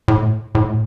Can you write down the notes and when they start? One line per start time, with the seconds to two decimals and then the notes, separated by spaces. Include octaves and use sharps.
0.08 A2
0.55 A2